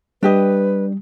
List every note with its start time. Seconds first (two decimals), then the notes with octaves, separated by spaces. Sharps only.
0.23 G3 D4 G4 B4 D#5